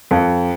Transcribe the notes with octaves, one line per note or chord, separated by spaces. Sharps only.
F2